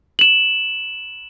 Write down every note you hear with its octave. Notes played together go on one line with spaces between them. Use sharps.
E7 F#7